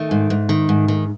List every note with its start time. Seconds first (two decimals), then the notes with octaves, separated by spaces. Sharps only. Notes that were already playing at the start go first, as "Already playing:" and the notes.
Already playing: D#3 A3
0.11 G#2
0.30 G#2
0.49 D#3
0.69 G#2
0.88 D#3